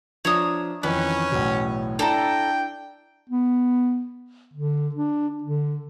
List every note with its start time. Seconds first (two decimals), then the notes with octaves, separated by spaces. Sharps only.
0.25 F3 D4 C#5 E5 A#5 D#6
0.83 F2 D#3 E3 C#4 B4
1.32 B1 E2 A2
1.99 D4 E4 A4 G5 A5 A#5
3.30 B3
4.54 D3
4.95 D4
5.44 D3